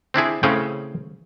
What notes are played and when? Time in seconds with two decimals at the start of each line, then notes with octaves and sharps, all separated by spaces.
0.14 C4 D4 E4 G#4
0.43 A2 C#3 C4 C#4 G#4